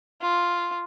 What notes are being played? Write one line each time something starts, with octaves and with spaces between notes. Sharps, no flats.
F4